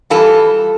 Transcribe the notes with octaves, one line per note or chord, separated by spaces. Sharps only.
E3 G3 F4 A4